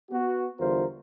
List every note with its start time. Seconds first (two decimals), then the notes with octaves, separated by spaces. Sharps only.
0.11 B3 F#4
0.59 E2 D3 G3 F4 A#4 C5